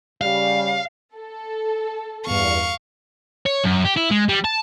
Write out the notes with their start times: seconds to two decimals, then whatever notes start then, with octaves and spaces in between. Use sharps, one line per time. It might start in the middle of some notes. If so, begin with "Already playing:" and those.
0.21 C#3 G3 F5
1.15 A4
2.26 E2 G2 F5 C#6
3.46 C#5
3.64 F#2
3.85 G4
3.96 E4
4.11 G#3
4.28 G3
4.44 A5